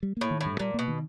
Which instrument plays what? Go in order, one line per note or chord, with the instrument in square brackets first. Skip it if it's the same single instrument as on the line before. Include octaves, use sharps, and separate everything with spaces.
[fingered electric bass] G3
[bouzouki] A2 [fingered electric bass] A#3
[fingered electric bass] D#3
[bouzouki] A2
[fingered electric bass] G2
[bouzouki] A#2 [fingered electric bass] G3
[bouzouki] B2 [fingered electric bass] A#3
[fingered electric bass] D#3